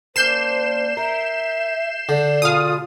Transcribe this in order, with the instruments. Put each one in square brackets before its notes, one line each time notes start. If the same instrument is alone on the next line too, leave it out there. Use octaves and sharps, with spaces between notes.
[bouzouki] A#3 C#4 D4 [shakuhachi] C5 [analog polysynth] G6 C7 E7
[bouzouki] A#4 [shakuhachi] E5
[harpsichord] D3 [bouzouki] D4
[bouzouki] B2 G#3 [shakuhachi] F4 [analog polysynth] F5 D#6